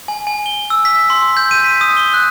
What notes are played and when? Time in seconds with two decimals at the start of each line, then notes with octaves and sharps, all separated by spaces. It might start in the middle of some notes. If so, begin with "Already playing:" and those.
0.08 G#5
0.27 G#5
0.46 G7
0.70 E6
0.85 B6
1.10 C6
1.37 G6
1.51 D#7
1.64 B6
1.81 D#6
1.97 G7
2.14 F#6